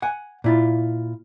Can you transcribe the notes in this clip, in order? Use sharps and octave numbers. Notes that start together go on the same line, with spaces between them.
F#5 G#5
A#2 E4 F4